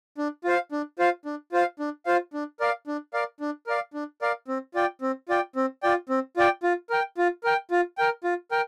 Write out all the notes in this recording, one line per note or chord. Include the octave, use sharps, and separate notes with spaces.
D4
F4 C5 F5
D4
F4 C5 F5
D4
F4 C5 F5
D4
F4 C5 F5
D4
A#4 D5 F5
D4
A#4 D5 F5
D4
A#4 D5 F5
D4
A#4 D5 F5
C4
F4 D5 G5
C4
F4 D5 G5
C4
F4 D5 G5
C4
F4 D5 G5
F4
A#4 G5
F4
A#4 G5
F4
A#4 G5
F4
A#4 G5